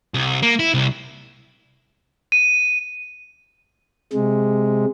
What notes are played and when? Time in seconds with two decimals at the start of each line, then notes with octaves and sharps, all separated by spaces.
0.14 C2
0.43 A#3
0.59 E4
0.74 C2
2.32 D#7
4.13 C3 G#3